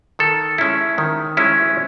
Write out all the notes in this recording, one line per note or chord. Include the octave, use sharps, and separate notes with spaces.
D#3 A4
G#3 C#4 E4
D#3
G#3 C#4 E4